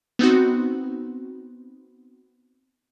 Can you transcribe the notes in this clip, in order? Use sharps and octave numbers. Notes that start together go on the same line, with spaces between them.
B3 C4 D#4 F#4